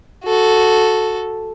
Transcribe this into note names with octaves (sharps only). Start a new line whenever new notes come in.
F#4 A4